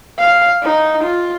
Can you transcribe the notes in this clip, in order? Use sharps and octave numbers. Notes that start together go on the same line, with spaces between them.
F5
D#4
F4